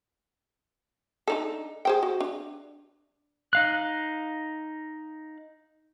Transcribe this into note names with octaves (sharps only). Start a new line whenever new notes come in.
D4 D#4 A4
G#4 C5 G5
F#4
D4
D#4 F5 F#6